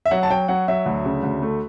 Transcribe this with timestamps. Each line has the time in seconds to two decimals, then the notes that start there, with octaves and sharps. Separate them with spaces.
0.06 E5
0.11 F#3 F#5
0.23 A5
0.30 F#3 G5
0.48 F#3 F#5
0.68 F#3 E5
0.86 D2
1.05 C#3
1.23 D2
1.42 A3